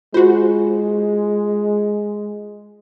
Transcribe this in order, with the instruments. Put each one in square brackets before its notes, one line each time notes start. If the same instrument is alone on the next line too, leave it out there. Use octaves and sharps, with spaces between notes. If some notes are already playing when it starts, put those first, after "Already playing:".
[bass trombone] G#3 [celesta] F4 [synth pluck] F#4 C5